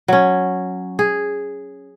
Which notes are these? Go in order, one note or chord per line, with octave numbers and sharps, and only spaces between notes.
F#3 C#4
G#4